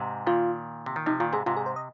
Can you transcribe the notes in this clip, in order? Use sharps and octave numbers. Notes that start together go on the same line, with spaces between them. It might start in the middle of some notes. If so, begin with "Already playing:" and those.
Already playing: G#2 C3
A#2 D#3 F4
C3
D#3
C3 F3 D#4
A#2 D#3 F4
G#2 C3 G#4
G#2 C3 F4
G#4
C5
D#5